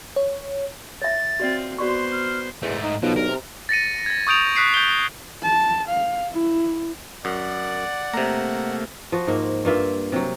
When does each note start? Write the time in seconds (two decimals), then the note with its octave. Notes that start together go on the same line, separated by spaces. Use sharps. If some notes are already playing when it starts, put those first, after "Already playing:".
0.16 C#5
1.02 C#5 E5 A6
1.40 C4 F4 F#4 D5
1.78 B3 F#4 C5 D5 C6 C#6
2.12 F6
2.62 E2 G#2 A3
2.83 D#4
3.03 B1 B2 F3
3.17 G2 A#4
3.29 C3
3.69 A6 A#6 C#7 D#7
4.06 G#6 A#6
4.27 C#6 D#6 G6 D7 F7
4.56 C#6 D#6 F#6 B6 C7 D7
4.74 G6 G7
5.42 A5
5.88 F5
6.31 E4
7.25 F#2 D5 F#5
8.14 C3 A3 A#3 A#5
9.12 F3 F#4
9.27 G#2 A#3
9.65 G2 A#3 F4 E5
10.12 C3 F#3